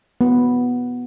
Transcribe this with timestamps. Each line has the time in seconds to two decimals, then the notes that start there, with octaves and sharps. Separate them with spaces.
0.21 B3